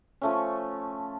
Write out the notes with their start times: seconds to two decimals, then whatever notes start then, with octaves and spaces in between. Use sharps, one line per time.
0.22 F3 A3 C#4